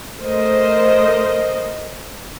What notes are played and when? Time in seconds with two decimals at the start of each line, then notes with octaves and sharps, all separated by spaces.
0.21 A3 A#4 C5 D#5